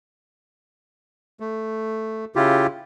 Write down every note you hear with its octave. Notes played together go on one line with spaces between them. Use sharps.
A3
C#3 E4 F4 G4